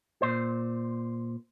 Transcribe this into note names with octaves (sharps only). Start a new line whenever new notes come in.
A#2 C5